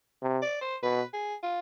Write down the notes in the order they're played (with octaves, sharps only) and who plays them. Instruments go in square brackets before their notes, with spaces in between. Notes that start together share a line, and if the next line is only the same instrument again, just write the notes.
[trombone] C3
[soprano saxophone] D5
C5
[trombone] B2 [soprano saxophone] B4
[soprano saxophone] G#4
F4